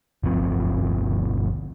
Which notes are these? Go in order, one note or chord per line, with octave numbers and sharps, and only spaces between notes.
G1 D2 F3 C4